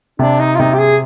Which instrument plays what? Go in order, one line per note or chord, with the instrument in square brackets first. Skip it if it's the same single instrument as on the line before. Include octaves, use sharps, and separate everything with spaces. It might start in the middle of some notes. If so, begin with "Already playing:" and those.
[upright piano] C3 [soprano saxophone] D4
[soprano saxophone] D#4
F4
[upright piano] C3 [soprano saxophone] D#4
[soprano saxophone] G4
G#4